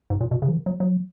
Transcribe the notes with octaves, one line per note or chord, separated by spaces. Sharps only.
G#2
A#2
B2
C#3
F3
D#3
F#3
F#3